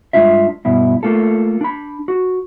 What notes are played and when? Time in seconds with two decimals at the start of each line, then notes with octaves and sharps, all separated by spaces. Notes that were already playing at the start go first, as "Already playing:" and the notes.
0.13 G2 F#3 G#3 D4 F4 E5
0.65 G2 B2 E4
1.03 A3 A#3 F4 A4
1.61 D4 B5
2.08 F#4